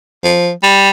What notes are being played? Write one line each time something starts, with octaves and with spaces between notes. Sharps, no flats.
F3
G3